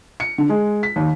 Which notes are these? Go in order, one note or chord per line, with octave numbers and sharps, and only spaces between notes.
C#7
D3
G#3
B6
D#2